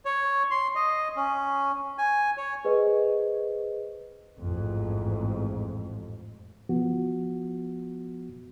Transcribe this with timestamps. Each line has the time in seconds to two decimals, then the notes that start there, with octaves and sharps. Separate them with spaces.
0.05 C#5
0.51 C6
0.75 D#5
1.16 C#4
1.98 G#5
2.37 C#5
2.65 G#4 B4 C5 D#5
4.38 A1 F2 G#2
6.69 F3 B3 F#4